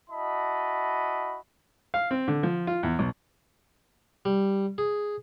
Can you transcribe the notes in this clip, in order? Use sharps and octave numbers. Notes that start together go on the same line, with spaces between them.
E4 F#4 D#5 A5 B5
F5
C4
D3
F3
F4
E2
B1
G3
G#4